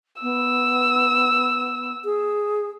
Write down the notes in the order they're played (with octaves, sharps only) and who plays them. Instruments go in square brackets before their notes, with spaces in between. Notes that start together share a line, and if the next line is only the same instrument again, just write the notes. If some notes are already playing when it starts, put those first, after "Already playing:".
[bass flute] B3 [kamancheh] E6
[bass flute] G#4